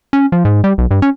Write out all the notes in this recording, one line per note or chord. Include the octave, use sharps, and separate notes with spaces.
C#4
F3
G#2
G3
B1
G2
C#4